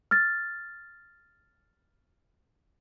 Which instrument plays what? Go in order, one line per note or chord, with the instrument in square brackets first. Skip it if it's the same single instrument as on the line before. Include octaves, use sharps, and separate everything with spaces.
[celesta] F6 A6